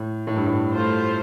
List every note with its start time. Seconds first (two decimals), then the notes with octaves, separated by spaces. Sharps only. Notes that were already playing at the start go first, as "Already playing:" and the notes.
Already playing: A2
0.27 A2
0.37 G2
0.47 A2
0.70 A3 F4 C5